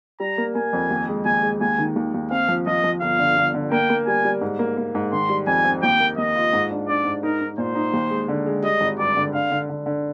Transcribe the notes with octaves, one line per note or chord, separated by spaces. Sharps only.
G3 A#5
A#3
A#3 G#5
F2
D#2
G#3
D#2 G#5
G#3
D#2 G#5
D#3
D#2
D#2
C4 F5
F3
F3 D#5
F3
G1 F5
D3
G1
D3
A#3 G5
A#3
G3 G#5
G3
G#2
A#3
A#3
G#2
D#3 C6
G3
F2 G#5
C4
D#2 G5
A#3
D#2 D#5
F4
G#2
D4
D4 D5
G#2
D#4 A#4
D#4
A#2 C5
D#4
D#2
G#3
D3
G#3
G3 D#5
G#1
G2 D5
D3
D3 F5
D3
D3
D3